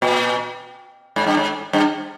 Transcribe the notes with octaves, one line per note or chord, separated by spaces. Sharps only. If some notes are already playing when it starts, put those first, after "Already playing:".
A#2
G#2
G2
G#2
G2